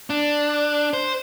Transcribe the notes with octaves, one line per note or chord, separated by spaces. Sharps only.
D4
C5